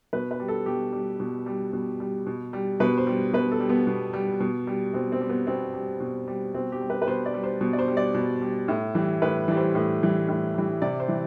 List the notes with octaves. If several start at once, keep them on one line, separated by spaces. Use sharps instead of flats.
B2 B4
B4
G3
A4
B2 G4
G3
B2
G3
B2
G3
B2
G3
B2 B4
C5
G3
B2 B4
A4
G3
B3
B2
G3
B2
G3
B2 C4
C4
G3
B3
B2 C4
G3
B2
G3
B2 C4
G4
G3
B4
B4
B2 C5
D5
G3
C5
B2
D5
C5
G3
D5
B2
G3
A2
E3 G3
A2 B4
E3 G3
C5
A2
E3 G3
A2
E3 G3
C3 D5
C5
E3 G3